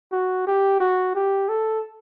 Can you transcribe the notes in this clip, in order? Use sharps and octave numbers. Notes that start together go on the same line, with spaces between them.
F#4
G4
F#4
G4
A4